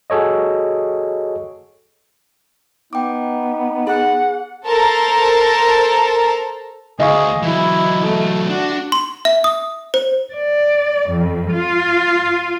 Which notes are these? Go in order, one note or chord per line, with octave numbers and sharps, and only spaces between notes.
F#4 G#4 A4 C#5 D#5
B3 D#4 G5 D6
G#4 F#5
A4 A#4 C5 A5 A#5
D2 G#4 D#5 F5 C#6
E3 F#3 E4
A3
D4 F#4
C6
E5
D#6
C5
D5
F2
F4